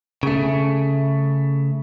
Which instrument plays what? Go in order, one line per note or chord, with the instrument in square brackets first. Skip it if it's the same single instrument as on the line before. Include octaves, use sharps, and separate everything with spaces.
[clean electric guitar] C#3 A3